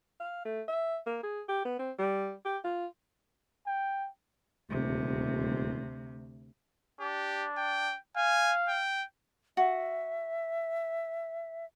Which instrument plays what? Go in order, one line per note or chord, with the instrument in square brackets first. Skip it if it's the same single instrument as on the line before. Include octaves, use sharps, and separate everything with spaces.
[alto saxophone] F5
A3
E5
A#3
G#4
G4
B3
C4
G3
G4
F4
[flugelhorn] G5
[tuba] D#1 [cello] D2 C3
[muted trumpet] D4 [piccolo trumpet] G4
[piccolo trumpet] G5
[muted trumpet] F5 [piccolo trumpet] G#5
[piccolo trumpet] G5
[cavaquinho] F#4 [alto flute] E5